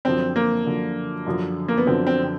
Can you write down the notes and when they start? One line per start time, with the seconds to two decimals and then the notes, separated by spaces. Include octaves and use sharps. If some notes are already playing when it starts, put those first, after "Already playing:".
0.05 F#2 D3 F3 C4
0.36 A#3
0.66 F#2 D3 F3
1.26 F#2 D3 F3
1.68 A#3
1.78 B3
1.86 F#2 D3 F3 C4
2.07 C4